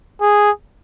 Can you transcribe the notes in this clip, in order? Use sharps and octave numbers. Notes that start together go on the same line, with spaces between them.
G#4